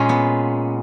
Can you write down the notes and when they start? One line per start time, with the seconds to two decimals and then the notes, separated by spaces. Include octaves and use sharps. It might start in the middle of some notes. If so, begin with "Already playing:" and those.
Already playing: A#2 G#3 C#4
0.09 B3